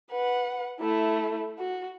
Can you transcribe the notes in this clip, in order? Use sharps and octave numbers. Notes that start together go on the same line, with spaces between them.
B4 F#5
A3 E4
F#4